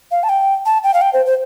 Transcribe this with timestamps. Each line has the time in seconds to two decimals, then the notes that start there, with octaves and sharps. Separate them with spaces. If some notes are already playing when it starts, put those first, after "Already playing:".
0.11 F5
0.23 A5
0.29 G5
0.66 A5
0.83 G5
0.94 F5
1.01 G5
1.13 C5
1.26 C5